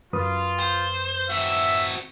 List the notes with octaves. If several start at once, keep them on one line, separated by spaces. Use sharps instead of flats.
F#2 F4 B4 D#6
C5
C4 F#4 E5